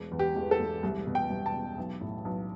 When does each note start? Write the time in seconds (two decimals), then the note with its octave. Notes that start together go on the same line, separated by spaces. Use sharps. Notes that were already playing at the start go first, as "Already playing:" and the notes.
Already playing: E1
0.12 E2
0.19 G4
0.36 E1
0.51 A4
0.60 E1
0.83 C2
1.07 B2
1.15 G5
1.30 C2
1.46 A5
1.54 B2
1.78 B1
2.01 A2
2.25 B1